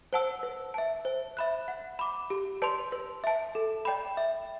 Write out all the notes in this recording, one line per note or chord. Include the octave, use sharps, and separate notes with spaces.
C5 F#5 A5 E6
B4
E5 A5
C5
E5 B5 F#6
F#5
B5 D6
G4
B4 D5 A5 C6
B4
E5 A5
A4
D5 G5 B5
E5